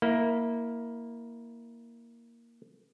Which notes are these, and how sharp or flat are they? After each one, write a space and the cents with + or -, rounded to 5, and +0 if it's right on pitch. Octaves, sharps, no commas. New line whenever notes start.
A#3 +0 E4 -15